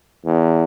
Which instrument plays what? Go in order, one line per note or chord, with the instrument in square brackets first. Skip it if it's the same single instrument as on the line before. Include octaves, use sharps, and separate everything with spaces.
[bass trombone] E2